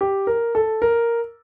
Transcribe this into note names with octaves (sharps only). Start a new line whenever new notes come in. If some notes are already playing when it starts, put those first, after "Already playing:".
G4
A#4
A4
A#4